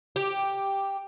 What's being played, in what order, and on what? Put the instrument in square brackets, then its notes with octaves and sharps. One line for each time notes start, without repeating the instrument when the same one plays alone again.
[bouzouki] G4